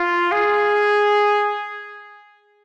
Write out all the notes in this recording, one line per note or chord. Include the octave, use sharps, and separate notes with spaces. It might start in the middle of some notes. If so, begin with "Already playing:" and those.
Already playing: F4
G#4